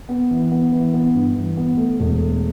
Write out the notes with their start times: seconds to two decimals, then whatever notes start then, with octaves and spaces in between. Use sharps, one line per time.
0.09 B3
0.31 E3
0.52 B3
0.72 E3
0.94 B3
1.15 G2
1.36 E3
1.57 B3
1.77 A3
1.99 E1
2.20 A3